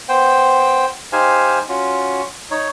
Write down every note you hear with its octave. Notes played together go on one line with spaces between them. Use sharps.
B3 C5 G5
D#4 G4 C5 F5 G#5
C#4 F4 F#4
D#4 C#5